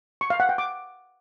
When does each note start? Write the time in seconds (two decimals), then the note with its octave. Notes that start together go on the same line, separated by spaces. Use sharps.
0.21 C#6
0.30 F5
0.40 F#5
0.49 G5
0.58 D6